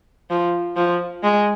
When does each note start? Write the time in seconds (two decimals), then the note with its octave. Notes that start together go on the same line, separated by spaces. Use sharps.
0.30 F3
0.77 F3
1.24 G#3